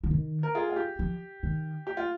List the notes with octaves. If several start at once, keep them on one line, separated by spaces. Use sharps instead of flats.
F3
D#3
A#4
F4 G#4
F4
G4
F3
D#3
G4
F4